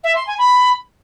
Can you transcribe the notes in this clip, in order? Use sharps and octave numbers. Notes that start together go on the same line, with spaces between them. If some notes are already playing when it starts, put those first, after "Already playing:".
E5
C6
G#5
B5